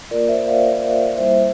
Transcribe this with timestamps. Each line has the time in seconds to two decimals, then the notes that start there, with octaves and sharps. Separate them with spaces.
0.11 A#3 F4 A#4 D5
0.29 C5 E5
0.46 D5 F5
1.17 G3 A#3 E4 C5 E5